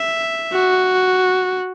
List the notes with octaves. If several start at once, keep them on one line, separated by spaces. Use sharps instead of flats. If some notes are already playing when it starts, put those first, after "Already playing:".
Already playing: E5
F#4